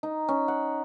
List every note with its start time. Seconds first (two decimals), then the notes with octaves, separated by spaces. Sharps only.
0.03 D#4
0.29 C#4
0.48 F#5